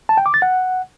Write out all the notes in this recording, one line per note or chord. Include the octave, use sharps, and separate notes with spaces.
A5
G5
D6
A6
F#5